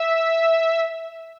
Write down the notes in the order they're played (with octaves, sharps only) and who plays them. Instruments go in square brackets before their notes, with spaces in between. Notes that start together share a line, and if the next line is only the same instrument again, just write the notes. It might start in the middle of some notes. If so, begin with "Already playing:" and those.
Already playing: [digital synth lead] E5